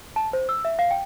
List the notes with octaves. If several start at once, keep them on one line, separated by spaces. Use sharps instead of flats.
A5
C5
E6
E5
F5
G5